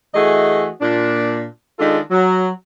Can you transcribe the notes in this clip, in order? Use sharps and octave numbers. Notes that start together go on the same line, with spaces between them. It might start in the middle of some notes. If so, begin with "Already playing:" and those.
E3 A3 F#4 G#4 D#5
A#2 D4
D#3 G#3 D4 F4 A4
F#3